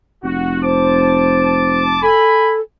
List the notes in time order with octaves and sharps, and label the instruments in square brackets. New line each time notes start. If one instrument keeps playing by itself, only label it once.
[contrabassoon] F1 [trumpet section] F#4
[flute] C5 [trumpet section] A5 D6
[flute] A4 [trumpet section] G#5 B5